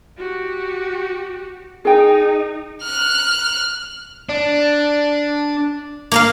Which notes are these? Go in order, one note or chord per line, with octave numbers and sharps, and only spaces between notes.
F#4 G4
D#4 G#4 G5
F6 F#6
D4
A#3 A#4 F5